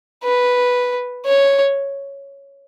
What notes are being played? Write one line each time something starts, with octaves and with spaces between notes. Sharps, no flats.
B4
C#5